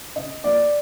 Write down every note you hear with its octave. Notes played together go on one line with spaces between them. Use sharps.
C#3 D#5
F3 A#3 D5